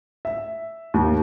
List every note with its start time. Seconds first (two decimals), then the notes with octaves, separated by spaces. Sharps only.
0.25 E5
0.94 D#2